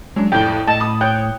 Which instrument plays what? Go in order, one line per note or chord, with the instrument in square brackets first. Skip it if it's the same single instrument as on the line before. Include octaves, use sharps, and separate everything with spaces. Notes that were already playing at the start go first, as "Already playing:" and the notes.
[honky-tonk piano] F#3 D4 [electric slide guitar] G#3
[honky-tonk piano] F2 A2 [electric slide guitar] D5 [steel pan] G5
[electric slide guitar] A2 [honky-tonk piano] D#5 [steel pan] A5
[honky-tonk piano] B5 D#6
[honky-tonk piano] C#5 F#6 [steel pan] G5